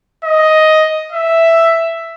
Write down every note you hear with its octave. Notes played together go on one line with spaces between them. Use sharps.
D#5
E5